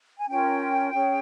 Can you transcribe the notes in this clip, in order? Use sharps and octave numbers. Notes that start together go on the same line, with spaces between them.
G#5
C#4 F4 A#4 G5
C#4 G#4 C#5